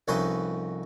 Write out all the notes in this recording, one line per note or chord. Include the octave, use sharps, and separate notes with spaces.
C2 F2 C#4 D#4 B4 C6